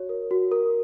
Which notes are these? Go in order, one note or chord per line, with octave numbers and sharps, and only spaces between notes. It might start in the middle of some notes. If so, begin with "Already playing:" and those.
Already playing: F#4 C#5
A#4
F#4
A#4